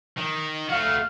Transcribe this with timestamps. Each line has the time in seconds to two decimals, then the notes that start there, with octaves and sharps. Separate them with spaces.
0.17 D#3
0.69 A3 F#4 F5